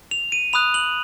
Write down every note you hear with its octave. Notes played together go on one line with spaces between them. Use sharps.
F7
D#7
B5 D#6 F#6 F7
F#7